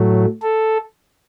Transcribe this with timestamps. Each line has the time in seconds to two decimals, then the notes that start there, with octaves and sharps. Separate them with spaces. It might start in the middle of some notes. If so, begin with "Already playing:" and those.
Already playing: A2 F#3 A3
0.43 A4